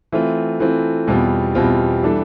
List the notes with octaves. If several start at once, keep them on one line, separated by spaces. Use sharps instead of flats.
E3 A3 C4 F4
E3 A3 C4 F4
E2 B2 G3 C4 F4
E2 B2 G3 C4 F4
E3 G3 D4 A4